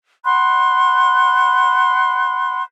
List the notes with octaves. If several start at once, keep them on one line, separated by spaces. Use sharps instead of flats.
F#5 B5 C6 F#6